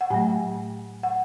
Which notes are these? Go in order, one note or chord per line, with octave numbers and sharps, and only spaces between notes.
F#5
A2 F#3 A3 G#5
F#5